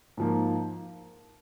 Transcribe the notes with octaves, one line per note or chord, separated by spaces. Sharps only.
G#2 F3 A#3